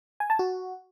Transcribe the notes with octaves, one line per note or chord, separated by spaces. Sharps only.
G#5
A5
F#4